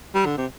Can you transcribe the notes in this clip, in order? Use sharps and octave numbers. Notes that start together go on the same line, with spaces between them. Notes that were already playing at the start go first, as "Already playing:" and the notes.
G3
D3
C3